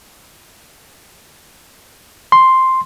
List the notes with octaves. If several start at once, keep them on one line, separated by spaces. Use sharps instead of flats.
C6